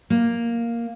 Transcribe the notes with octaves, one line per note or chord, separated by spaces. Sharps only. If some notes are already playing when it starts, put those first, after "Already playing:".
A#3